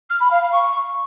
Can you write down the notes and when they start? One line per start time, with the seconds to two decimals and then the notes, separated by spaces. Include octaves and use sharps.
0.09 F6
0.20 B5
0.31 F5
0.41 F5
0.52 C#6